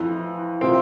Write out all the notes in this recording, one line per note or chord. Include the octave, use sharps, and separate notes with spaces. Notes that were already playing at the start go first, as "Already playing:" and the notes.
Already playing: F2 E3
C3 F3 C4